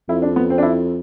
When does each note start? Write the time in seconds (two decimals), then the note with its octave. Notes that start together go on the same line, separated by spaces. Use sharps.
0.09 F2 E4
0.22 D4
0.36 B3
0.50 C4
0.58 D4
0.63 E4